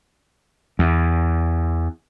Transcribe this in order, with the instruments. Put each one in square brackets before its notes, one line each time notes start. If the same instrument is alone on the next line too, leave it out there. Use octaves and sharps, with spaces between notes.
[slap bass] E2